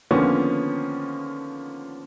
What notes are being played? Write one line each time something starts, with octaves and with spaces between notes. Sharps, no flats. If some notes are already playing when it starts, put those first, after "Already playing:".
D3 D#3 F3 A#3 B3 C#4